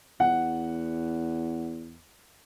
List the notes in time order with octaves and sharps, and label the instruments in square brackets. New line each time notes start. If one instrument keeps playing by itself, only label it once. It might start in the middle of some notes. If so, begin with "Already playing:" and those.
[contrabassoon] E2 [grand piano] F#5